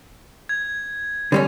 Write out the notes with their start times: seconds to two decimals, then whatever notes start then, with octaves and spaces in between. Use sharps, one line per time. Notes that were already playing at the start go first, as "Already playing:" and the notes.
0.49 G#6
1.32 D3 G3 C#4